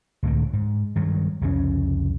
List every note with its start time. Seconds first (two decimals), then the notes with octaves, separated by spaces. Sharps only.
0.23 C#2 A2 D3 D#3
0.53 G#2
0.96 G2 D#3 F#3
1.41 C2 F2 C#3 C#4